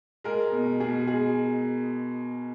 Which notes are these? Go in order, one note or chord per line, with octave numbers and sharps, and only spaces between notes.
G#3 A#4
B2
B2 G#4
G#3 G#4